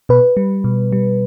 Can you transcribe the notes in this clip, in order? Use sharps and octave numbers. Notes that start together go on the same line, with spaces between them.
B2 B4
G3
B2
G3